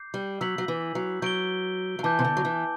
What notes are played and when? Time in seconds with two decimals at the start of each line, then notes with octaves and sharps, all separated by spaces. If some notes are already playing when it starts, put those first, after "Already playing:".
Already playing: D6 G6 C7
0.14 G3
0.41 F#3 E6 B6 F#7
0.58 F#3
0.68 E3
0.95 F#3
1.22 F#3 G6 D7 G7
1.99 F#3
2.03 E3 A5 D6 G6
2.19 C3
2.24 D3
2.37 F#3
2.45 E3